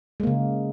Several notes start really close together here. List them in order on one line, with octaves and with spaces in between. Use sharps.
G#3 A#3 C#3